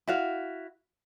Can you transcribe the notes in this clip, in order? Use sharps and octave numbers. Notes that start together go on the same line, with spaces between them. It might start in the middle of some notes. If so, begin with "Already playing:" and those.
E4 F#4 F5